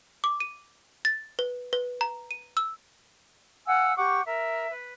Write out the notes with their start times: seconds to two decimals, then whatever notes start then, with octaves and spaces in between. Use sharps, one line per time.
0.24 D6
0.40 D#7
1.05 A6
1.39 B4
1.73 B4
2.01 A#5
2.31 D#7
2.57 E6
3.66 F5 F#5 G#5 E6
3.97 G4 F#5 C#6 D6
4.25 A#4 E5
4.69 B4